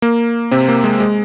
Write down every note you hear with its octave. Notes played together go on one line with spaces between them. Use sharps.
A#3
C3 C4
A#3
G#3
G#3